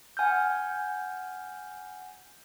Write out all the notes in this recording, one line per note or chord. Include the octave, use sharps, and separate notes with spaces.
F#5 G#5 F6 G6